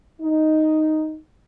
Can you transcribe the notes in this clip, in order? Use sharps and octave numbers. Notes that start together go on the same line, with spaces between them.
D#4